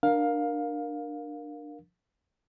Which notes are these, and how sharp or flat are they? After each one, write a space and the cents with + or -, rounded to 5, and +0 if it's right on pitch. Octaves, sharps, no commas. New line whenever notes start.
D4 +20 A#4 +10 F5 +15